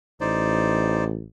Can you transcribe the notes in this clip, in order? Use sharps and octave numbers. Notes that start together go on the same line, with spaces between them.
A1 D#4 C5 D5